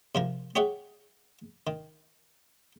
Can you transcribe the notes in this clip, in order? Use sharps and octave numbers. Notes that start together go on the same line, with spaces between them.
C3 F3 A#4
G4 G#4 C#5 E5 F#5
D#3